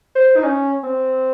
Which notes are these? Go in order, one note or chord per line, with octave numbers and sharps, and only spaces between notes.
C5
D#4
C#4
C4